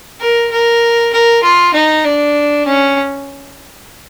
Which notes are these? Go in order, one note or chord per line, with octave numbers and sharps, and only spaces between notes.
A#4
A#4
A#4
F4
D#4
D4
C#4